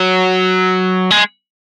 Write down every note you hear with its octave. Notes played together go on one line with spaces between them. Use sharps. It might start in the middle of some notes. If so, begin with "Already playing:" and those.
Already playing: F#3
G#3